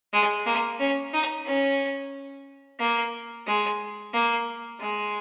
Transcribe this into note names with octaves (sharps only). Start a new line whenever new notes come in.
G#3
A#3
C#4
D#4
C#4
A#3
G#3
A#3
G#3